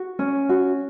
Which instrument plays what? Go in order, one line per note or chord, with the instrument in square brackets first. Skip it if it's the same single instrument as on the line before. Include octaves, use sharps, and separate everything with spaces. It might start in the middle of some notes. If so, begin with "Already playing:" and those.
Already playing: [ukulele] F#4
C#4
F#4